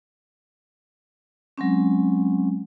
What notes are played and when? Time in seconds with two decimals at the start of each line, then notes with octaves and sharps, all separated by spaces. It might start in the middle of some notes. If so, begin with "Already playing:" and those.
1.58 F#3 G#3 C4 C#4